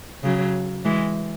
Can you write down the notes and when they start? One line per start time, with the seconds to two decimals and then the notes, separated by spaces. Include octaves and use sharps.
0.23 C#3 F#3
0.85 E3 G#3